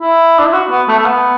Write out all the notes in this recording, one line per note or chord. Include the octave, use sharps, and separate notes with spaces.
E4
D4
E4
F#4
B3
A3
A3
B3